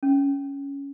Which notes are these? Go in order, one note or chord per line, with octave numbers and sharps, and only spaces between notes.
C#4